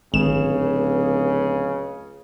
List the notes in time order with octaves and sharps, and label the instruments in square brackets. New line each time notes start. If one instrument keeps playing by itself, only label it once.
[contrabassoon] D1 [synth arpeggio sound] G#1 E7 [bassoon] C#2 [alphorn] C#3